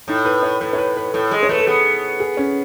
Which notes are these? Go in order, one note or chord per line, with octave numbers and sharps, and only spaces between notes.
A2 D#4
B4
C#5
A2 B4
C#5
B4
B4
A2 A4
G#3
C#5
A3 B4
A4
B3 G#4
G#4
C#4